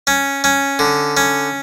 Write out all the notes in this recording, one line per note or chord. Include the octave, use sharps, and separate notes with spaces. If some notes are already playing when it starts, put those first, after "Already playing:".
C#4
C#4
D3
C#4